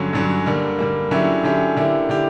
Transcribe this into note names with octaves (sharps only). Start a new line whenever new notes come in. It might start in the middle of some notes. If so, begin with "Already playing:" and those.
Already playing: G2 D3 F#3 C#4
G2 D3 F#3 C#4
D3 G3 A#3
D3 G3 A#3
D3 F#3 C#4 E4 G4
D3 F#3 C#4 E4 G4
D3 A#3 E4 G4
D3 A#3 E4 G4